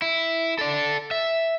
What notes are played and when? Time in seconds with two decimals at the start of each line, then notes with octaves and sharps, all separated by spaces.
0.02 E4
0.59 A4 D5
1.11 E5